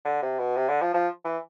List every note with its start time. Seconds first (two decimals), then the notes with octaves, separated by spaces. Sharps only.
0.05 D3
0.22 C3
0.39 B2
0.56 C3
0.69 D3
0.82 F3
0.94 F3
1.25 E3